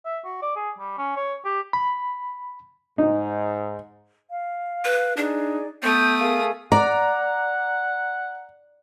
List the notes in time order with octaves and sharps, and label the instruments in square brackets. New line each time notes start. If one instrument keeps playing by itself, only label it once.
[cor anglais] E5
F#4
D5
G#4
G3
C#4
C#5
G4
[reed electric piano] B5
[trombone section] G#2 [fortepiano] D#4
[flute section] F5
[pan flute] B4
[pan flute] D4 [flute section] D#4 G#4 D5
[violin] A3 D#6 [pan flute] B3 [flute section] G6
[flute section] G#4 A#4 F5
[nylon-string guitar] D5 [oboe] F#5 [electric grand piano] A#5